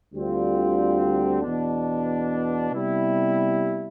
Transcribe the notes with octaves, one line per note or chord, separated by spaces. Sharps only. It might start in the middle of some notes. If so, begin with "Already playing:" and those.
D2 D3 G3 C4 F4
E2 B2 B3 D4
C3 G3 B3 E4